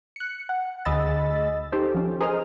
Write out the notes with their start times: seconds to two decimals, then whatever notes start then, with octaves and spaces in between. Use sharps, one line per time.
0.16 F#6 C#7
0.49 F#5
0.85 D2 G#4 D#5 B5 E6 A6
1.72 D#4 G4 A4 C5
1.94 F3 C#4
2.21 G#4 A#4 C5 D#5 D#6 F6